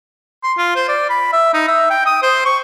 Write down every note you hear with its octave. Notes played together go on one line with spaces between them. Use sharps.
C6
F4
C5
D5
B5
E5
D#4
E5
G5
D#6
C5
C#6